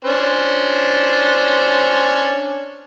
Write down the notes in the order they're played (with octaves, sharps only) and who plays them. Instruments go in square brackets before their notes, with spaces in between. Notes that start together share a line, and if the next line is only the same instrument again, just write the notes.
[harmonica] C#4 D4 C5